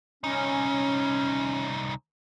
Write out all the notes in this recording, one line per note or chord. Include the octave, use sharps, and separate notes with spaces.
C2 C#4 D#4